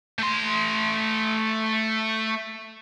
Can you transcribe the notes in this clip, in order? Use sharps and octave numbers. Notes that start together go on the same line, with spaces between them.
A3 C6